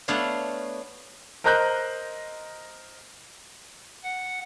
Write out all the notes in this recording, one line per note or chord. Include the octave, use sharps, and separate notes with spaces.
A3 B3 D4 C#5 F5
A#4 C5 D#5 A#5 F#6 G6
F#5